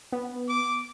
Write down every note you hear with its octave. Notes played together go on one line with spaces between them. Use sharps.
B3
D6